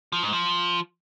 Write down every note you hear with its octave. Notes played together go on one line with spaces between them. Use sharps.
F3
G#2
F3